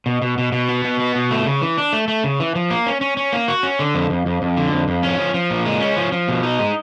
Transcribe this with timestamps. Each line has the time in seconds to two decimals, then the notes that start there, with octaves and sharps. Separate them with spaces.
0.06 B2
0.22 B2
0.38 B2
0.52 B2
0.69 B3
0.84 B2
1.00 B3
1.15 B2
1.31 A3
1.46 C#3
1.62 E3
1.78 D4
1.93 A3
2.08 A3
2.24 C#3
2.40 E3
2.55 F3
2.70 A#3
2.86 C#4
3.01 C#4
3.17 C#4
3.33 A#3
3.48 F#4
3.63 C#4
3.79 D3
3.95 F2
4.10 F2
4.26 F2
4.42 F2
4.57 D3
4.72 F2
4.88 F2
5.03 C#4
5.18 F3
5.34 F3
5.50 A#2
5.65 G#3
5.80 C#4
5.97 F3
6.12 F3
6.28 B2
6.43 D#4
6.59 G#3